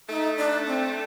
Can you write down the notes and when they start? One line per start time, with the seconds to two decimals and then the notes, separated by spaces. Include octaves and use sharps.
0.09 A3 D#4
0.38 D4
0.67 C4